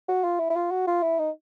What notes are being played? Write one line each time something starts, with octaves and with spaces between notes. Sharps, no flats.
F#4
F4
E4
E4
F4
F#4
F4
E4
D#4